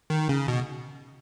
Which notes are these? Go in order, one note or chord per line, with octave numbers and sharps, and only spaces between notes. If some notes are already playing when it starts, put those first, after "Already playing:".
D#3
C#3
B2